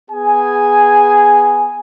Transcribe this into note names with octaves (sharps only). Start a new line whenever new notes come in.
B3 G#4 G#5